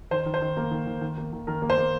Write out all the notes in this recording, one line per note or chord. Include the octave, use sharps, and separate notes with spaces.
D#3 C5
D#3
C5
D#3
A#3
D#3
D#3
D#3
A#3
D#3
D#3 A#4
A#3
C5
A#3